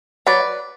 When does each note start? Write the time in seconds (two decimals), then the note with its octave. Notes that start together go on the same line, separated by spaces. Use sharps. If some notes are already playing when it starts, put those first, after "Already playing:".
0.26 F#3 B4 D5